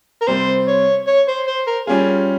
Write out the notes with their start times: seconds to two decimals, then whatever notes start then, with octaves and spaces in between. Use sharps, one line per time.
0.21 A#4
0.27 C3 G3 C4 C5
0.68 C#5
1.07 C#5
1.28 C5
1.47 C5
1.67 A#4
1.87 G3 C#4 F4 G#4